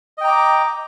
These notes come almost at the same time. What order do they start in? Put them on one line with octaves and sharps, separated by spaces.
D#5 G5 A#5 D6